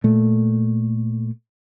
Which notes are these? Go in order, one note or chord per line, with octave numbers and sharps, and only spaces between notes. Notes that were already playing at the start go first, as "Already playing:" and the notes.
A#2 A3